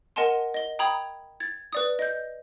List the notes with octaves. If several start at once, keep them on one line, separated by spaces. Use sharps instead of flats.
A#4 D#5 F#5 G#5 A5 C6
D#5 G7
G5 A#5 B5 D#6 G#6
G#6 A6
B4 D5 D#6
D#5 G6